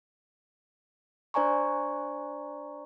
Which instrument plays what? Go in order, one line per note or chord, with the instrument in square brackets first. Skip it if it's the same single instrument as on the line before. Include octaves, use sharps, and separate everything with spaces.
[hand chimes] D4 C5 D5 G#5 A#5 C#6